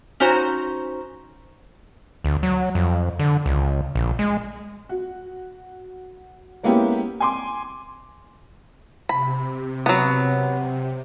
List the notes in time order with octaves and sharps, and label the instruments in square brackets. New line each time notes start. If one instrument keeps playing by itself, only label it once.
[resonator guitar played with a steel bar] C#4 D#4 F#4 C5 A#5
[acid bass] D2
F#3
F2
D3
C#2
A#1
G#3
[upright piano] F#4
G#3 A#3 B3 C#4 E4 G4
G#5 C6 D6
[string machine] C3 [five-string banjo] B5
[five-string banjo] F#3 B3